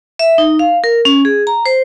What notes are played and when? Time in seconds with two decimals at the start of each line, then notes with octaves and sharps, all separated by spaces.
0.19 E5
0.38 D#4
0.59 F5
0.84 A#4
1.05 C#4
1.25 G#4
1.47 A#5
1.66 C5